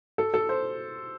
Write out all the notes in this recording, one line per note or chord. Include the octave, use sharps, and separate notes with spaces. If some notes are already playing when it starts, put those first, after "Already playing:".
A4
A4
C5